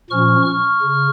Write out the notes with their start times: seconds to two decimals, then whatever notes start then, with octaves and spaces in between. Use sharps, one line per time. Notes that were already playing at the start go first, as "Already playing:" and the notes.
0.10 A#2 F3 C#4 C#6 F6
0.46 C#6 F6
0.82 C#3